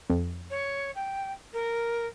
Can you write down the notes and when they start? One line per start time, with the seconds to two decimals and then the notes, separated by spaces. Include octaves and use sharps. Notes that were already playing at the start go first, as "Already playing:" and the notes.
0.10 F2
0.50 C#5
0.95 G5
1.53 A#4